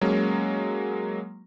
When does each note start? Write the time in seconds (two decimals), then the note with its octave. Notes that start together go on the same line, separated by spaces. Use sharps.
0.01 F#3 G#3 A#3 C#4